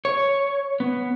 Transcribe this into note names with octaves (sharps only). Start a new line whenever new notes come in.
C#5
B3